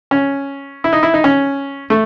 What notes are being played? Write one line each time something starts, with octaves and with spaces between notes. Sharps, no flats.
C#4
E4
D#4
E4
D#4
C#4
A3